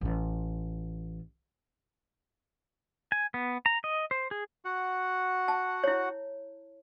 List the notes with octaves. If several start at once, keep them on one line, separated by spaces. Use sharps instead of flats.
A1 F4
G#5
B3
A#5
D#5
C5
G#4
F#4 F#5
A5
E4 C#5